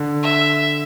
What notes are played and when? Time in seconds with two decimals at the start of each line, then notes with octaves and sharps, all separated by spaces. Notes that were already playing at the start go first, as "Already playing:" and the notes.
Already playing: D3
0.23 E5